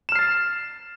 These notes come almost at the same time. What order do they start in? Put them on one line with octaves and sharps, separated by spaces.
E7 F6 C7 A6